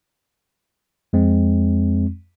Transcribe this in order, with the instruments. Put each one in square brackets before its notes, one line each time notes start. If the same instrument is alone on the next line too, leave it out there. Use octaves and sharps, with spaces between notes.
[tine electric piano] F2 G#3 C4